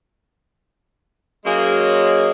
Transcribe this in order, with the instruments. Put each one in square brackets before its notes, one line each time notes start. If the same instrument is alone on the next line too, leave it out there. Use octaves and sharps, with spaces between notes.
[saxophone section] F#3 G#3 A#3 C#4 G#4